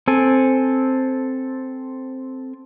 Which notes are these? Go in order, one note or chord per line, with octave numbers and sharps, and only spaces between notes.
C4 A4 G#5